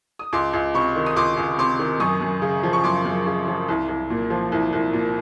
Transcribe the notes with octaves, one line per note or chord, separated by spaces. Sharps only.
D#6
C#2 C6 D6
C#2
C3 B5 C#6
D#3
D#6
C#2 C6 D6
C#2
C3 C6 D6
D#3
F#2 C#6 D#6
F#2
C#3
F3
C#6
F#2 C6 D6
F#2
C#3
F3
C2
C2
A#2
F3
C2
C2
A#2